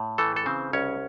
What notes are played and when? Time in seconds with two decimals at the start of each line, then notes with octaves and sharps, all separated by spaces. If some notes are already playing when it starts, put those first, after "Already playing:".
Already playing: A2
0.18 E3 A3 A4
0.36 A4
0.46 C#3 C4 C5
0.73 C2 C#4 C#5